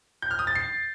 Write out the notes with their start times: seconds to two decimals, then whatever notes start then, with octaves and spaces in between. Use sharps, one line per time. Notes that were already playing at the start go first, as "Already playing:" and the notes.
0.22 G6
0.31 F6
0.39 D#6
0.47 A6
0.55 C7